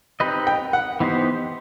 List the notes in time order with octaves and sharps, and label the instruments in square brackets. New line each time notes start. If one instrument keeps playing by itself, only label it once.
[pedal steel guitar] C4 D#4 G4 B4 D#5
[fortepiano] G5
F#5
[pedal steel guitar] E3 B3 D#4 G4 C5